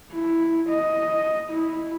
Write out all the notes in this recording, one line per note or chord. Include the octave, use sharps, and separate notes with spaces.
E4
D#5
E4